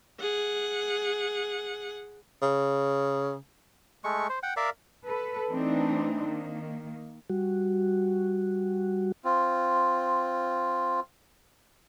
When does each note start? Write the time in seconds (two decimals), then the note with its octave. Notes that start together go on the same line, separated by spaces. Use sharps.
0.21 G#4 F#5
2.42 C#3
4.04 G#3 A3 C#6
4.29 C5
4.43 F#5 G5
4.57 A#4 D5 E5 F5
5.06 A4 B4
5.50 E3 A3 C4 D4 D#4
6.26 D#3 A#3
7.30 G3 F#4
9.25 C4 F4